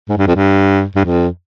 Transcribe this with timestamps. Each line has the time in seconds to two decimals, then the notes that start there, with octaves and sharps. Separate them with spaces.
0.09 G#2
0.17 G2
0.27 F2
0.35 G2
0.95 G2
1.05 F2